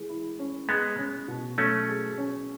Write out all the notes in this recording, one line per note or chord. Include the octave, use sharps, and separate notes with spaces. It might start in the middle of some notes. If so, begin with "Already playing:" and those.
Already playing: E3 G#3
E4
C#4
G#3 B3 G#4
C#4
B2
F#3 A3 C#4
G#4
C#4